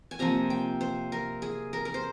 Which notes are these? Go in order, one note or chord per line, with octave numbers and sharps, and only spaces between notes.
G#5
C3 F3 A#3 A#5
G5
C5
A#4
G#4
A#4
A#4
C5